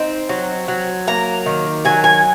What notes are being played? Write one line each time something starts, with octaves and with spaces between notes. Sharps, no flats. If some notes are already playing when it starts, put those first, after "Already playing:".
Already playing: C4 D#4
F#3
F#3
A#3 A#5
D#3
F#3 G#5
G#5